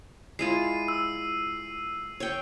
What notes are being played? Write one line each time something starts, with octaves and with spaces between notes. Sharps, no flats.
G#3 E4 F4 C7 D#7
E6
C#5 G5 C#6